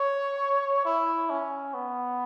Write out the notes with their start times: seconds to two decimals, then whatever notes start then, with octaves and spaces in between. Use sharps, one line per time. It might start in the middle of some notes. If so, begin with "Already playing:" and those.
Already playing: C#5
0.85 E4
1.30 C#4
1.74 B3